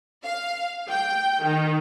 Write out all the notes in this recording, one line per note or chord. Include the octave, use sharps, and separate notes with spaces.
F5
G5
D#3